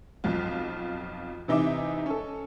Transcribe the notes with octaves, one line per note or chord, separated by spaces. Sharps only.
B1 F2 F4
C3 E3 D#4 E5 D6
C#4 A4